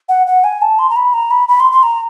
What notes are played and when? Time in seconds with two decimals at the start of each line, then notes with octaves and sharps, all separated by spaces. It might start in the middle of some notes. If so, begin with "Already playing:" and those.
0.09 F#5
0.27 F#5
0.44 G#5
0.61 A5
0.79 C6
0.90 A#5
0.96 B5
1.14 A#5
1.31 B5
1.48 B5
1.60 C6
1.72 C6
1.83 A#5